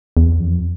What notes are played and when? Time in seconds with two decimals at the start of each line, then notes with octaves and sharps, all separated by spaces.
0.17 E2
0.39 F2